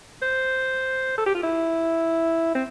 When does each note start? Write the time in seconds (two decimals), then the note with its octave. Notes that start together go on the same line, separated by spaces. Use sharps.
0.22 C5
1.18 A4
1.26 G4
1.35 F4
1.43 E4
2.55 C4